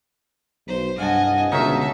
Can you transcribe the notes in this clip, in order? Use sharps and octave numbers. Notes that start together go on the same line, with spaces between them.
B1 C5
C2 G2 D#5 F5 F#5 G#5 A5
C#2 B2 D3 D#4 A#4 C#5 E5 A5